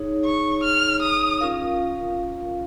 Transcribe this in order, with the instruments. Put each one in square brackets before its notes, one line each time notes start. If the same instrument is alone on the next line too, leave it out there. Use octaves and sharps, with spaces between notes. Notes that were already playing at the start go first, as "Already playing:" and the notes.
Already playing: [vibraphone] D#4 G#4 C#5
[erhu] C#6
F6
D#6
[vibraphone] C#4 F4 A#4 F5